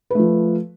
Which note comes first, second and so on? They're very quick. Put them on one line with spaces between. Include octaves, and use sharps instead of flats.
B4 A3 F3